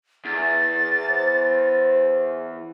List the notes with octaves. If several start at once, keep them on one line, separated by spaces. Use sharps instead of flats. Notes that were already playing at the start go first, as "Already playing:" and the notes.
E2 A6
C5